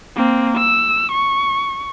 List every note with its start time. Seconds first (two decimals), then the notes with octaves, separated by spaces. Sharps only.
0.16 A#3 C4
0.58 E6
1.11 C#6